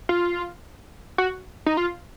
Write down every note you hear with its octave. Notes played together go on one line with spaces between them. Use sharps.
F4
F#4
D#4
F4